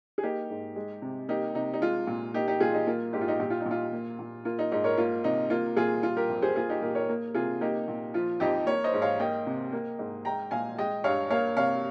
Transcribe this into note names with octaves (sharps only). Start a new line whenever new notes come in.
G#4
A#3 D#4 G4
G#2
G#3
C3
A#3 D#4 G4
C3 D#4
D#4
G#3 F4
A#2
A#3 D#4 G4
D#4 G4
A#2 F4 G#4
D#4
A#3 F4
G#2 G4
F4
D#4 G4
A#2 G4
F4
D#4
A#2
F4
A#3
A#2
A#3 F4
D#4
G#2 D#4
A#4 C#5
A#3 F4
C3 D#4
A#3 F4
A#2 F4 G#4
G3 F4
G4 A#4
F2
G#4 C5
A#3 F4 G#4
D#4 G4
A#2 G4 A#4
A#4 C#5
A#3
C3 F4 G#4
A#3 D#4 G4
A#2
F3 F4
F2 D#4 G4
A#3 A#4 C#5
C5 D#5
G#2
C#5 F5
A#3 D#5 G5
C3
A#3
G#2
G#3 G5 A#5
A#2 F5 G#5
G#3 D#5 G5
G2 C#5 F5
A#3 C#5 F5
C3 C#5 F5